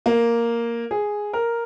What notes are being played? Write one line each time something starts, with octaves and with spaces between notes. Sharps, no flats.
A#3
G#4
A#4